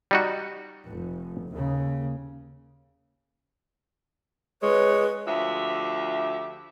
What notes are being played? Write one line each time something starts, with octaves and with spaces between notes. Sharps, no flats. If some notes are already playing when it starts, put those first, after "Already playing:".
G3 D#4 F#4
F1
D#2 C#3
G#3 B4 C#5
D2 F3 G4 E5